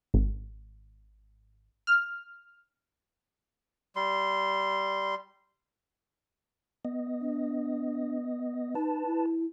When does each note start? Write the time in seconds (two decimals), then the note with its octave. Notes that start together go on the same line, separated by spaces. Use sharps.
0.14 G#1
1.87 F6
3.96 G3 C6
6.85 B3 D#5
7.21 D4
8.75 D#4 B4 A5
9.06 E4